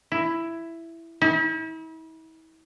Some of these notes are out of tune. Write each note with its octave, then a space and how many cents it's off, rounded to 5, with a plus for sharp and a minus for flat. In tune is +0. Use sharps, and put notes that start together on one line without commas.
E4 +10
E4 -40